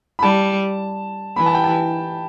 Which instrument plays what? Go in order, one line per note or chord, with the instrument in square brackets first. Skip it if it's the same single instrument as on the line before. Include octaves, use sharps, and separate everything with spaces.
[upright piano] B5
[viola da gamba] G3 [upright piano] A5
[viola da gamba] E3 [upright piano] B5
[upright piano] A5
G5
A5